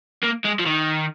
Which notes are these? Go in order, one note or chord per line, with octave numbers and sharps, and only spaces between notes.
A#3
G#3
F3
D#3